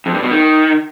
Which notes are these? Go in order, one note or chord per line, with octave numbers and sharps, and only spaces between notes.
F2
G2
B2
D#3